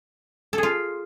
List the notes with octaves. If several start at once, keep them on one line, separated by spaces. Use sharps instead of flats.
A4
G#4
F4